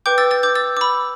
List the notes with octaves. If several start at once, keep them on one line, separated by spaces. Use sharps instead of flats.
B4 G5 D6 G6
E6 A6
E6 A6
D6 G6
E6 A6
D6
B5 E6